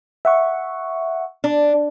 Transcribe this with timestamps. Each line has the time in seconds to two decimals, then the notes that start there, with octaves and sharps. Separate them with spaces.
0.25 E5 F#5 C#6
1.44 D4